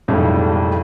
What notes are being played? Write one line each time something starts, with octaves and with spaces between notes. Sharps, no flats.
B1 F2 A2 G3 G#3